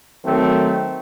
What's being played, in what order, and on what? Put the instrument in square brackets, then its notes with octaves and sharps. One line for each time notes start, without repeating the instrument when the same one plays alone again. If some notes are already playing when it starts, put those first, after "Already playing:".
[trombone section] D#3 F#3 A3 C4